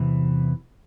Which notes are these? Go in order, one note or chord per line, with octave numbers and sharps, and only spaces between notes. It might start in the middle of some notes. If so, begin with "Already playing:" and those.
Already playing: E2 C3 E3